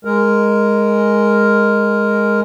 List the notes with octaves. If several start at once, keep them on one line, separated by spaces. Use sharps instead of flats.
G#3 A#4